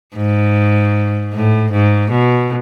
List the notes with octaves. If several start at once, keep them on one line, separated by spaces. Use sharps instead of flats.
G#2
A2
G#2
B2